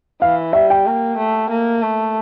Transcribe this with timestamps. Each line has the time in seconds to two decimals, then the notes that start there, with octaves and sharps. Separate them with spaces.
0.21 E3 F5
0.53 G3 E5
0.70 G5
0.86 A#3
1.17 A3
1.50 A#3
1.82 A3